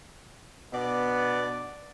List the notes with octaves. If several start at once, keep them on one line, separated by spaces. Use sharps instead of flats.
B2 B3 D4 D5